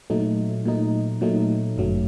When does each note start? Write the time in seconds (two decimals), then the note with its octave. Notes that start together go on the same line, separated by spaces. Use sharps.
0.10 A#2 F#3 A3 D#4
0.65 A#2 F#3 A3 D#4
1.21 A#2 F#3 A3 D#4
1.77 G1 F#2 F#3 A3